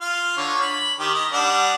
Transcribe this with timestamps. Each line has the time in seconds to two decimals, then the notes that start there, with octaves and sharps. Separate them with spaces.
0.01 F4 F5
0.37 D3 C#5
0.61 B5
0.99 D#3 G4
1.14 D#5
1.33 G3 D4 F#5